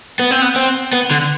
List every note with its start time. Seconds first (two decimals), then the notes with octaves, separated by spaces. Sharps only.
0.19 B3
0.31 C4
0.42 B3
0.56 C4
0.93 B3
1.11 D3